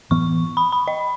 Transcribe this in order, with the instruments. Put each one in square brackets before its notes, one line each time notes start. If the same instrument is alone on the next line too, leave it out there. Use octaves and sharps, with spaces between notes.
[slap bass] A2 E3 B3 [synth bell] C#6
[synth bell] B5
B5
D#5